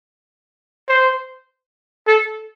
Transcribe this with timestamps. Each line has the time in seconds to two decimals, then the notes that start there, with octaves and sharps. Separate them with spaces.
0.89 C5
2.07 A4